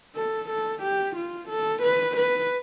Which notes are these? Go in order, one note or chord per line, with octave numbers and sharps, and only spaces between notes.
A4
A4
G4
F4
A4
B4
B4